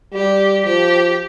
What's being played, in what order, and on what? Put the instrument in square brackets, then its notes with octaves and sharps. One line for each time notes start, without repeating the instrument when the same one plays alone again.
[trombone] G3 [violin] G4
[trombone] F3 [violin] G4